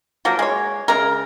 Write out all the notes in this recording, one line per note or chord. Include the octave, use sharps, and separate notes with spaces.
F3 F#3 A#3 A#4
G#3 C#5
C#3 G#3 A#4